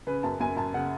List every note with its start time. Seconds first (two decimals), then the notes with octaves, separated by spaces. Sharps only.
0.07 C#3 B4
0.23 F#2 A5
0.40 F#2 G#5
0.57 F#2 A5
0.74 C#3 F#5